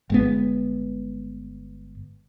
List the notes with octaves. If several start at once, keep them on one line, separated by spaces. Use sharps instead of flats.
G1 G#3 B3